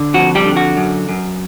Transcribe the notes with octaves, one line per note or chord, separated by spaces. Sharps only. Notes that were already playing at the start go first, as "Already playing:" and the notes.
Already playing: D3
F2 F#4
G3 G4
D3
F#4
F#2
F#2